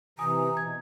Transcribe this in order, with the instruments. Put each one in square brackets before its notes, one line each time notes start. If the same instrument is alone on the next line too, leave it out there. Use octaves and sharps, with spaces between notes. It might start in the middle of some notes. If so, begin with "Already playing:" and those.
[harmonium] C3 E3 [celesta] G#5 D#6 [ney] A#5
[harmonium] B2 [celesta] G#6